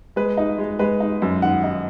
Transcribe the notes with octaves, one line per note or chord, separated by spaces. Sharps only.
G#3 B4
D#4
G#3
G#3 B4
D#4
F#2
D#3 F#5
D#4